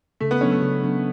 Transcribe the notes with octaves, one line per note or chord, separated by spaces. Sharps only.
C#3 A3
B3
F#3 B3 C#4 D4 A4
A3
C#3
F#3 B3 D4 A4